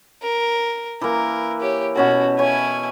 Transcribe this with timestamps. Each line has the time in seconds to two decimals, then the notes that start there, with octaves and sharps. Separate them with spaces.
0.22 A#4
1.01 E3 A#3 A#4
1.61 G4 C#5
1.96 B2 C#4 F#4 A5
2.39 E4 C#5 G#5